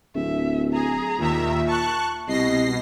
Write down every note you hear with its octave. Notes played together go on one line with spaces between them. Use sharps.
D1 E5
G#4 A#5
D#2 A#2 D#3 E5
A5 C#6 F#6
C2 B2 D#5 A#6 C7